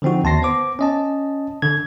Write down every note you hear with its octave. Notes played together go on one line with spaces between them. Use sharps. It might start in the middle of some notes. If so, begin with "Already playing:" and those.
D3 F3 C4 D#4 F#4
D#2 A5 C6 A#6 C7
B3 C5 D6
C#4 D#5 A5
D3 G#6